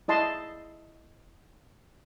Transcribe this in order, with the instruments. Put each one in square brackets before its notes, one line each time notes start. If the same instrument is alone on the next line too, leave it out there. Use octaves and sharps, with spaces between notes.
[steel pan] E4 D#5 A5 C6